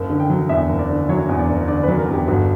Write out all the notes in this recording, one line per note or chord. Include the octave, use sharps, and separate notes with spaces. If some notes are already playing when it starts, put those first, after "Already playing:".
Already playing: F#1
D3
G5
F#3
E2 E5
F#1
D5
D3
F#3 C#5
E2
D5
F#1
D3 D5
B4
F#3
A#4
E2
G4
G1 F#4